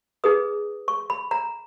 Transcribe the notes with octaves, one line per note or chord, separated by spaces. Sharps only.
D#4 G#4 B4 D#6
C#6
B5
A#5